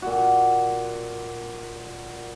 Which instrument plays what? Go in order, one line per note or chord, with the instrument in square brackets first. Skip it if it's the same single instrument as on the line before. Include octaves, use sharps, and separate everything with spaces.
[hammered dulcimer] A#2 F#4